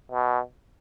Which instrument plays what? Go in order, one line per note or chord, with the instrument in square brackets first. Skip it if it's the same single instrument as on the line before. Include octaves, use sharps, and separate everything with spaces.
[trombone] B2